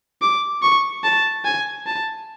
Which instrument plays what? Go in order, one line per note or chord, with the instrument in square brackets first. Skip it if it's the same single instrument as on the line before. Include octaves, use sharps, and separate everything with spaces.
[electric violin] D6
C#6
A5
G#5
A5